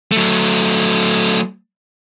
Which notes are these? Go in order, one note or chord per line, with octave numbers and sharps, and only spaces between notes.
F#3 A3